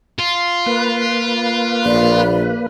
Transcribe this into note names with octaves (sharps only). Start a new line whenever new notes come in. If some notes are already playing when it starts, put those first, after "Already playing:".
F4
A#3 B4
A#1 D5